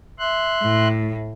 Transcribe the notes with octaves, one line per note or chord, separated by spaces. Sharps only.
E5 C6 F#6
A2